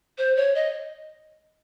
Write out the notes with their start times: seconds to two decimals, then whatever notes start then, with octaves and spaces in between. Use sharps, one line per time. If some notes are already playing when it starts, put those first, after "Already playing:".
0.18 C5
0.36 C#5
0.55 D#5